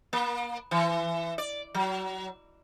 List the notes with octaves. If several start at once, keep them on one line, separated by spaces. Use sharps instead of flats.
A#3
E3
D5
F#3